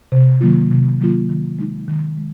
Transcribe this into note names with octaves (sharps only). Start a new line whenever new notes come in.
C3
D#3 F#3 A#3 F4
C3
D#3 F#3 A#3 F4
D#3
G#3 D#4
D#3
G#3